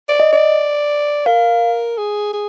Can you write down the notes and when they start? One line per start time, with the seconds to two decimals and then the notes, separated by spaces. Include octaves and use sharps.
0.09 D5
0.20 D#5
0.32 D5
1.26 A#4 F5
1.98 G#4
2.33 G#4